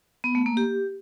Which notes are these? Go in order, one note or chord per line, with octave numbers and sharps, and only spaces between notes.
B3
A3
A#3
G4